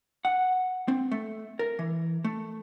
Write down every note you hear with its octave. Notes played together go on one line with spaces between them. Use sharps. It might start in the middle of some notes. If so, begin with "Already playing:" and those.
F#5
C4
A3
A#4
E3
A3